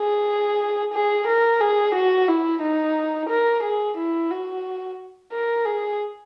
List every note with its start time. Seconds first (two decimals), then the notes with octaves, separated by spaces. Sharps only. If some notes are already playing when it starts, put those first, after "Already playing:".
Already playing: G#4
0.93 G#4
1.27 A#4
1.61 G#4
1.95 F#4
2.28 E4
2.62 D#4
3.30 A#4
3.63 G#4
3.97 E4
4.31 F#4
5.32 A#4
5.66 G#4